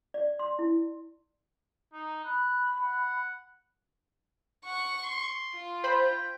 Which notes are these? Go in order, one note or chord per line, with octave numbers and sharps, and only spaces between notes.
D5
C6
E4
D#4
B5 F#6
F#5
F#5 C#6
C6
F4
C5 G5 B5